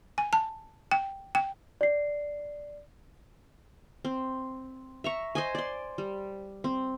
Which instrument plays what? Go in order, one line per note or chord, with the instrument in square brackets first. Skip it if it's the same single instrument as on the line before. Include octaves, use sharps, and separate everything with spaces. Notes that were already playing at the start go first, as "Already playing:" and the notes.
[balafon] G#5
A5
G5
G5
[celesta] D5 C7
[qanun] C4
E5 A#5 C#6
C5 D#5 G#5
D5 C6
G3
C4